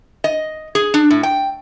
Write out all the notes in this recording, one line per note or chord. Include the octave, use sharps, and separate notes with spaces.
D#5
G#4
D4
A2
G5